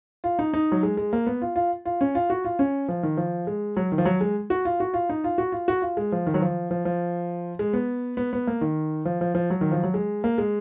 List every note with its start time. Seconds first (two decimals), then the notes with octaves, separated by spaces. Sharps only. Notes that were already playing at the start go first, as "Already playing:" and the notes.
0.24 F4
0.39 D#4
0.54 D#4
0.72 F#3
0.83 G#3
0.97 G#3
1.13 A#3
1.27 B3
1.42 F4
1.56 F4
1.85 F4
2.01 C#4
2.15 F4
2.30 F#4
2.45 F4
2.59 C#4
2.88 F3
3.03 D#3
3.17 F3
3.47 G#3
3.77 F#3
3.92 D#3
3.98 F3
4.05 F#3
4.21 G#3
4.50 F#4
4.65 F4
4.80 F#4
4.94 F4
5.09 D#4
5.24 F4
5.38 F#4
5.52 F4
5.68 F#4
5.82 F4
5.97 G#3
6.12 F3
6.27 D#3
6.34 F#3
6.41 F3
6.71 F3
6.85 F3
7.59 G#3
7.73 B3
8.17 B3
8.33 B3
8.47 A#3
8.61 D#3
9.05 F3
9.21 F3
9.35 F3
9.50 F#3
9.61 D#3
9.72 F3
9.83 F#3
9.94 G#3
10.24 A#3
10.38 G#3